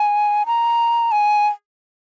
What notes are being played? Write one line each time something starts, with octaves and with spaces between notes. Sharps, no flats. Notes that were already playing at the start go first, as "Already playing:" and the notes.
Already playing: G#5
A#5
G#5